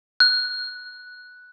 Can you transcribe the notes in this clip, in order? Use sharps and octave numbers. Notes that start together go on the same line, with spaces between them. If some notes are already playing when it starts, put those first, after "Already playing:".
F#6